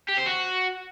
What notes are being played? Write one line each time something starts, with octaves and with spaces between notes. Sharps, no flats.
G4
C5
F#4